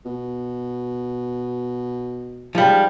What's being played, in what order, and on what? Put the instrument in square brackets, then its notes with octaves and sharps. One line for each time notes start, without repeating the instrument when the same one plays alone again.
[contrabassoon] B2
[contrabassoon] G#2 [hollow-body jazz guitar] F3 G3